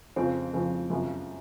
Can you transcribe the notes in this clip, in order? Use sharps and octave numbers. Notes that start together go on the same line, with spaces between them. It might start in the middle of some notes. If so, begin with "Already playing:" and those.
F2 C#3 F3 C4
F2 C#3 F3
F#2 C#3 F3